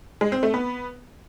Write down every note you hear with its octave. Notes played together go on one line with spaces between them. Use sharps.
G#3
C4
A3
B3